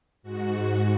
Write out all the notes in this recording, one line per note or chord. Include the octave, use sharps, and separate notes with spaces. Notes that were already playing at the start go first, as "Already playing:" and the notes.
G#2 F#4